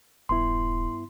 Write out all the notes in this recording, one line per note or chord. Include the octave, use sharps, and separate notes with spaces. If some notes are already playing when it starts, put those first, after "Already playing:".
D#1 G2 B3 E4 C6